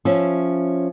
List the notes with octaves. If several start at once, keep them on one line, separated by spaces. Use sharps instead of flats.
F3 C#4 E5